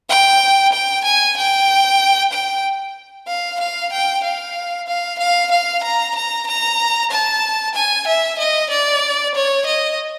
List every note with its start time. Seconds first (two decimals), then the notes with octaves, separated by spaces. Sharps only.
0.09 G5
0.73 G5
1.05 G#5
1.37 G5
2.33 G5
3.28 F5
3.60 F5
3.93 G5
4.24 F5
4.88 F5
5.19 F5
5.51 F5
5.84 A#5
6.16 A#5
6.47 A#5
7.11 A5
7.75 G#5
8.08 E5
8.39 D#5
8.71 D5
9.35 C#5
9.66 D#5